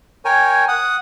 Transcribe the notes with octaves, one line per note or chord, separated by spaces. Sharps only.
A#4 C#5 G5 G#5
F#5 D#6